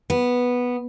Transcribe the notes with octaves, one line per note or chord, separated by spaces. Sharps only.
B3